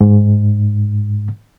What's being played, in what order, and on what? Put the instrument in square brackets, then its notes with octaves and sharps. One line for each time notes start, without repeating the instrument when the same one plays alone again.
[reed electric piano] G#2